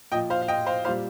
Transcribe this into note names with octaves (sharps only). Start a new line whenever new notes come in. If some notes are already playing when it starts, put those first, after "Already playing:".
A#2 F3 D#5 G5
C5 F5
F5
D#5 G5
C5 F5
A#2 G3 C5 F5